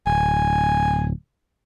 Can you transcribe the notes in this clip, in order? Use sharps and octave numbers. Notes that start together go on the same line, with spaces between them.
D1 G#5